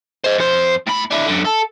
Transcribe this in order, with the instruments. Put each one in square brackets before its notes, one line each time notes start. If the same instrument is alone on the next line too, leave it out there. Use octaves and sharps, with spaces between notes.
[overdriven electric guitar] C5 D#5
F2 C5
A2 B5
D4 E4
F#2 D3
A4